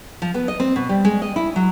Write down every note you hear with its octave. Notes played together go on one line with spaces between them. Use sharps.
F3
B3
D#5
C4
B2
G3
G#3
D#5
E4
F#3